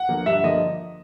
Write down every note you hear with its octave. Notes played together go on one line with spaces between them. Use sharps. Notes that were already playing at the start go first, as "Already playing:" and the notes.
Already playing: F#5
D3 F3 A#3
G2 E5
D3 F3 A#3 D#5